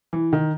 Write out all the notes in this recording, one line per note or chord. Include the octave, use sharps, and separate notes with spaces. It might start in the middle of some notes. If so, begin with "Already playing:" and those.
E3
D#3